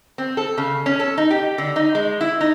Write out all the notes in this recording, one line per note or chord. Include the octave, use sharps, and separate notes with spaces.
C4
A4
C#3
C#4
A4
D#4
G4
D3
D#4
G#3
E4
D#4